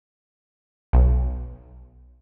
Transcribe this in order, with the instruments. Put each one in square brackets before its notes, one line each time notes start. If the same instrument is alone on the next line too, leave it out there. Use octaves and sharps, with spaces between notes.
[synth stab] B1